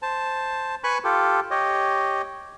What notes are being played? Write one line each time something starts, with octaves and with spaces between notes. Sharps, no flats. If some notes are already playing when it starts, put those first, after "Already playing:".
C5 A5
B4 G#5 B5 C#6 F#6
F4 G4 A4
G4 C#5 D#5